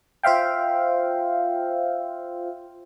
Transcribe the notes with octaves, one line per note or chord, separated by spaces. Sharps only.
F4 C5 E5 F5 G5